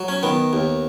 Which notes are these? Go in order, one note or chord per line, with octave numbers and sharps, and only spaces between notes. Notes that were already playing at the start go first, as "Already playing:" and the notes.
Already playing: F#3
C#4
D#3 B3
D#2